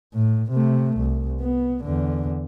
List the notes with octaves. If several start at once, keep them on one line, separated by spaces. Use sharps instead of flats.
A2
C3 A3
C2
B3
E2 D3